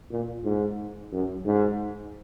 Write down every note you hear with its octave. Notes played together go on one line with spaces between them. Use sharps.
A#2
G#2
F#2
G#2